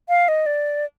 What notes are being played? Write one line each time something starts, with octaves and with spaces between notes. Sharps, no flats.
F5
D#5
D5